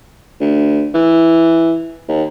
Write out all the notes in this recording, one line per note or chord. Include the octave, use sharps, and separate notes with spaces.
D2
E3
D#2